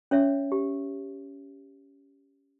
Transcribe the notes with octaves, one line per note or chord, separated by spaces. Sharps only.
C#4 C#5 E5
G4